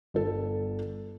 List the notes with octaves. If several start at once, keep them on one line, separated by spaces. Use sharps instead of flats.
G1 A4